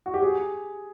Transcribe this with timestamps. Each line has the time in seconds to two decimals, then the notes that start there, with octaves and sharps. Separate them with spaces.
0.06 F#4
0.14 G4
0.22 G#4